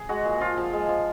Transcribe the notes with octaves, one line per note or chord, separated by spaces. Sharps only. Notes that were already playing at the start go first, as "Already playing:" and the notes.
Already playing: G#4
G#3 F#4
A#2
F3 F4
F3
G#3
F3